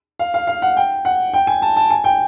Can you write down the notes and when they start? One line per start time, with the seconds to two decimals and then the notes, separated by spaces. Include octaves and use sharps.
0.19 F5
0.34 F5
0.47 F5
0.62 F#5
0.77 G5
1.05 F#5
1.33 G5
1.47 G#5
1.62 A5
1.76 A5
1.90 G#5
2.04 G5